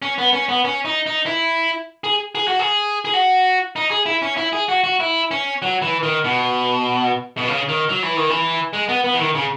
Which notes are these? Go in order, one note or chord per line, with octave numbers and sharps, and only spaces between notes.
C#4
B3
C#4
B3
C#4
D#4
D#4
E4
G#4
G#4
F#4
G#4
G#4
F#4
D#4
G#4
E4
C#4
E4
G#4
F#4
F#4
E4
C#4
F#3
E3
D#3
B2
B2
C#3
D#3
F#3
E3
D#3
E3
G#3
B3
B3
E3
D#3
C#3